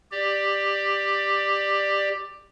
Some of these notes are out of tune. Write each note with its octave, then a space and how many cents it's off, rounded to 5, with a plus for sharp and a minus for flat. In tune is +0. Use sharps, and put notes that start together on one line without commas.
G4 +10 D5 +15